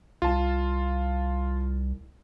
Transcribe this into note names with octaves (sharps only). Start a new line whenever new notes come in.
C2 F4 A5